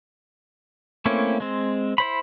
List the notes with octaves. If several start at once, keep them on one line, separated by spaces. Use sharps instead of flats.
A3 A#3 C4 C#4 E4
G#3 C4
E4 C5 B5